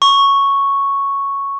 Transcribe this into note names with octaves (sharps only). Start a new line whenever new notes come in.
C#6